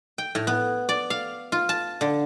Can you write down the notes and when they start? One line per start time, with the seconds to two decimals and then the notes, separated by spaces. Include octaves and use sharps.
0.18 G5
0.35 A2
0.47 B3
0.89 D5
1.10 F5
1.52 F4
1.69 A5
2.01 D3